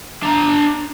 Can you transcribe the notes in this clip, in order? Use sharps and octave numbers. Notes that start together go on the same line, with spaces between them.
D4 A#5